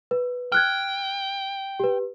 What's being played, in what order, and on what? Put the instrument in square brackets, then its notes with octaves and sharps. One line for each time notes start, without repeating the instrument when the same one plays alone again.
[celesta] B4
[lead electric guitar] G5 [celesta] F6 F#6 G#6
[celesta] G4 B4